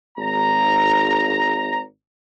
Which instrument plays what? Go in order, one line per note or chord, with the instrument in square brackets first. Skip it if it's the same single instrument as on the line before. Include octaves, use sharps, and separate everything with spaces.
[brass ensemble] G#1 A#5